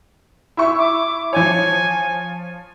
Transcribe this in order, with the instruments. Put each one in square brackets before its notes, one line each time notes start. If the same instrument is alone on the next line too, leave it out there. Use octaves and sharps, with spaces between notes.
[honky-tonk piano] E4 E5 C#6
[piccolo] D6
[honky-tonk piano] F3 C#5 [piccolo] G#5